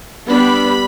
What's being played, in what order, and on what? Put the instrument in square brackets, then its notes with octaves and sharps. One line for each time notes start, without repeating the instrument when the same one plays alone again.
[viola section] G3 B3 D4 B5